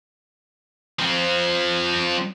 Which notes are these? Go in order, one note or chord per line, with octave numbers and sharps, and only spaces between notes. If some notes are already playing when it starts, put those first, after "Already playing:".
F3 C4